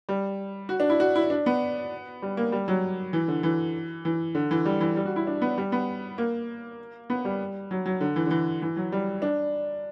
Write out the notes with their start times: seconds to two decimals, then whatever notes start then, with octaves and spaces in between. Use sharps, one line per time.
0.09 G3
0.69 F#4
0.80 D4
0.90 E4
1.00 F#4
1.15 E4
1.30 D4
1.46 B3
2.22 G3
2.37 A#3
2.52 G3
2.68 F#3
3.13 E3
3.28 D3
3.43 E3
4.05 E3
4.35 D3
4.51 E3
4.65 G3
4.80 E3
4.96 G3
5.06 F#4
5.16 E4
5.27 D4
5.42 B3
5.58 G3
5.72 B3
6.18 A#3
7.10 B3
7.25 G3
7.71 F#3
7.86 F#3
8.01 D3
8.16 E3
8.27 D3
8.30 E3
8.62 E3
8.76 F#3
8.92 G3
9.22 D4